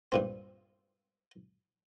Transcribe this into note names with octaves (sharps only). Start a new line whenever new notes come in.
G2 A#2 C4